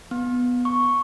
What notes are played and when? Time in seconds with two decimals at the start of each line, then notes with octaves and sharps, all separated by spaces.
0.11 B3
0.65 C#6